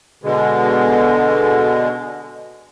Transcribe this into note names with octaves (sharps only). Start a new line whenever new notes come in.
B2 D3 G#3